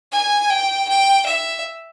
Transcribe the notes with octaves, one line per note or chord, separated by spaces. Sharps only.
G#5
G5
G5
E5